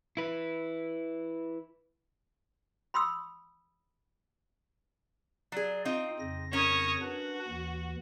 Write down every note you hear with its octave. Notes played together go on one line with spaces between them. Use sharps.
E4 B4
B5 C6 D#6 E6
F#3 G#4 D5
C4 D#4 F4 F5
F2 C#3 A#6
C#4 A#4 C#5 D#6
D4 F#4 B4
D#2 E3